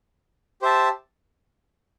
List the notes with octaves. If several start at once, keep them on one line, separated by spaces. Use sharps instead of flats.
G4 C5 E5 A5